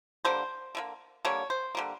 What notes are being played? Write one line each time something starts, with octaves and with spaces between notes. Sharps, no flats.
D3 G3 A#3 C5
D3 G3 A#3
D3 G3 A#3 C#5
C5
D3 G3 A#3